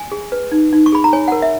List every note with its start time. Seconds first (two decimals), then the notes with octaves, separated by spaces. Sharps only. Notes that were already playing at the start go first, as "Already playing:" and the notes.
Already playing: G#5
0.12 G#4
0.32 B4
0.52 D#4
0.73 D#4
0.86 C#6
0.92 G#4 B5
1.04 A#5
1.13 C#5 G#5
1.28 A#4 F#5
1.42 E5